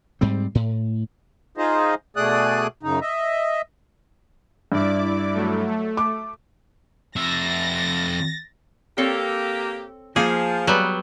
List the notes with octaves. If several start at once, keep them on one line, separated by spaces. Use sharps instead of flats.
G#2 G3 C4
A2
D#4 F4 G#4 C5 D#5
B2 A3 G#4 D5 D#6 F#6
F#2 C#3 D#4
D#5 E5
G2 E4 D5 D6
F#3 A3
A3
D6
F2 E5 A6 A#6
A#3 C4 G4 A4 C#5
F3 A#3 G#4 G#5
F#3 G3 B3